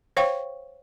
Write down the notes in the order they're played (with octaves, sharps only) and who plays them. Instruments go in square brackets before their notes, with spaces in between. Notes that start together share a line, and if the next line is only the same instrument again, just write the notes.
[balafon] C5 C#5 F5 G5 C#6